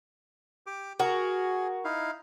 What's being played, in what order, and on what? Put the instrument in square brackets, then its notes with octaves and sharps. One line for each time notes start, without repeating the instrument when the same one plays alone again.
[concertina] G4 D6
[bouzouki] F#4 A#4 [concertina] G#4
[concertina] D#4 E4 F5